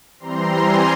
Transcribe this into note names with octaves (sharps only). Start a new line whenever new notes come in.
E3 G3 C4 A#5 C6
G#5 A#5